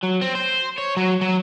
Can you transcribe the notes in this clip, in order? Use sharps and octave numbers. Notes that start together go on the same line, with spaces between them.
F#3
C4
C5
C#5
F#3
F#3